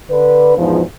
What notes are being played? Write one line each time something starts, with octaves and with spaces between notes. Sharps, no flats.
D3 B4
E2 G#2 B2 F3